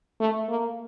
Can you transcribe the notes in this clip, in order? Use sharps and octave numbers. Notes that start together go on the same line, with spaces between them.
A3
A#3